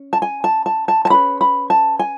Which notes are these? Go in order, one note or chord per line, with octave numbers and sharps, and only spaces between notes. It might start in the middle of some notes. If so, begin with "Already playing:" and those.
Already playing: C#4
A5
G#5
A5
A5
A5
A5
C#4 G#4 B4 B5
B5
A5
G#5